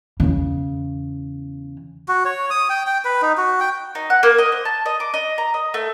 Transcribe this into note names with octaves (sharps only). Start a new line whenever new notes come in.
E2 C#3
F#4
C#5
D#6
G5
G5
B4
D#4
F#4
G5
D#4
F#5
A#3
D#5
C5
A5
D#5
D6
D#5
A#5
D#5
A3